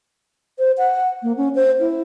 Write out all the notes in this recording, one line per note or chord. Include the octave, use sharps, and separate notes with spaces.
C5
F#5
A#3
C#4
C5
E4